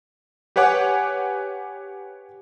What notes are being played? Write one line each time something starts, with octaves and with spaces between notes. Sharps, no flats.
G4 B4 C#5 F#5 G#5 D6